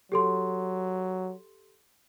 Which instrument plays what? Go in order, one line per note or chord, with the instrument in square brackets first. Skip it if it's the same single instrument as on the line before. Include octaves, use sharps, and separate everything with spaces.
[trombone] F#3 [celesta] G4 A4 C6